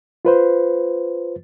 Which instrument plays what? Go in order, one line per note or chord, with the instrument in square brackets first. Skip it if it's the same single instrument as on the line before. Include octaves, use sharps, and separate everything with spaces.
[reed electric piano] F4 B4 C5